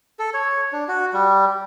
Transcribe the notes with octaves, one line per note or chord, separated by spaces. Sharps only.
A4
C#5
D4
F#4
G3